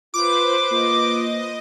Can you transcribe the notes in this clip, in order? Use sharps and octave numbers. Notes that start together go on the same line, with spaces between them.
F4 B4 C5 D6
A#3 F4 D#5